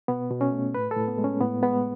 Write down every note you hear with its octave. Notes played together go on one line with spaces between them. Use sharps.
B2 B3
B2
C#4
A3
A2 B4
A4
A2
B3
G#3
C#4
A2 B3
G#3 B3